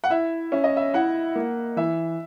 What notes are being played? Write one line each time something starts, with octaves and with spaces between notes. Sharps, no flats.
F#5
E4 E5
C#4 E5
D#5
E5
E4 F#5
A#3
E3 E5